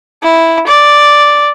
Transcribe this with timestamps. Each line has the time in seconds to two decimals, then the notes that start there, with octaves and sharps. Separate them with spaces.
0.23 E4
0.67 D5